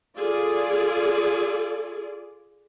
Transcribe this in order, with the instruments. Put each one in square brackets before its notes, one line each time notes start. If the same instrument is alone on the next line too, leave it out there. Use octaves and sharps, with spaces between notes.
[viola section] F4 G#4 A4 D5